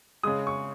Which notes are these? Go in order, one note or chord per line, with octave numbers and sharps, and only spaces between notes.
C#3 G#3 D#6
C#6